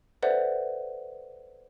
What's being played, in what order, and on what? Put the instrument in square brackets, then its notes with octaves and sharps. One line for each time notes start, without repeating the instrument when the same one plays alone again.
[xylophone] A4 B4 C5 D5 E5 F#5